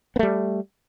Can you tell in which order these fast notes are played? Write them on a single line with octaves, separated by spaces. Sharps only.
B3 A3 G3